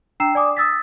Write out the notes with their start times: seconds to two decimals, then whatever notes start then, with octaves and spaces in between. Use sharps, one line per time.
0.20 D4 G5 A#5 E6 C7 E7
0.35 D5 G#5 D6 D#6
0.57 D#6 E6 A6 B6